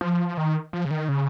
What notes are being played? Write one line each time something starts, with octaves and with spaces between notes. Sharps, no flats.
F3
D#3
F3
C#3
D#3
C#3